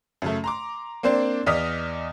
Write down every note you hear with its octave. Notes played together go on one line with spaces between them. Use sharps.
F#2 C#3 A3
A#5 C6 D6
A#3 C4 D4 C5 D5
E2 D5 D#5 D#6 F6 B6